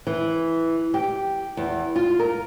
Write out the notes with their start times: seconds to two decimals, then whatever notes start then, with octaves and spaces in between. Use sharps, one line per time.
0.07 E3
0.94 G4
1.57 E2
1.96 F4
2.19 A#4